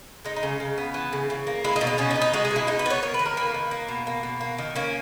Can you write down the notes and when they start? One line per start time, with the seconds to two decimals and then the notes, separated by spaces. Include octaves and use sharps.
0.25 G#3 D#4
0.36 D#4
0.43 C#3
0.60 C#3
0.78 B3
0.94 E3
1.13 C#3
1.30 C#3
1.47 A#3
1.64 G#3 E4
1.76 D#4
1.81 B2
1.87 D#4
1.98 B2 C#4
2.11 D#4
2.15 B3
2.22 D#4
2.33 G#3 F#4
2.45 G#4
2.51 B2
2.56 E4
2.67 B2 D#4
2.79 B4
2.86 B3 C#5
3.03 A#3 C#5
3.14 B4
3.19 D#3
3.26 A#4
3.37 A#3 B4
3.54 D#3
3.71 A#3
3.88 B2
4.07 A#3
4.23 B2
4.41 A#3
4.58 D#3
4.76 A#3 C#4